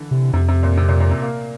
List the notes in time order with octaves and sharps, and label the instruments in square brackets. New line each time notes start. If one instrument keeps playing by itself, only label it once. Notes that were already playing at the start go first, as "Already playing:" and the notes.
Already playing: [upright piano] D3 E3
[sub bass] C3
[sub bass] F2 [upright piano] C3
[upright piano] C3
A#2
C3
A#2
A#2
C3
A#3